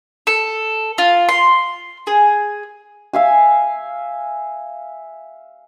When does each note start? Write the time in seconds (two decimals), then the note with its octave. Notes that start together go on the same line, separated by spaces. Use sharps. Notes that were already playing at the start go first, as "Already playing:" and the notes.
0.27 A4
0.98 F4
1.29 C6
2.07 G#4
3.13 E5 F5 G#5